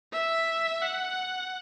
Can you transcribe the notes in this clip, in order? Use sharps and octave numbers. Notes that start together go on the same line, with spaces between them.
E5
F#5